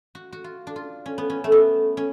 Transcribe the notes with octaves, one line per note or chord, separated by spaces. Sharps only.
F#4
F#4
F4
D4
F4
C#4
B3
C#4
A3
B3
C#4